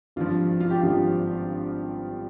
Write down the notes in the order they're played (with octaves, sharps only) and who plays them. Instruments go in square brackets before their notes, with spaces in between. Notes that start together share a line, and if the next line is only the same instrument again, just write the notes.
[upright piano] G#1 G2 F3 F4
F4
G4
G#1 G2 F3 F4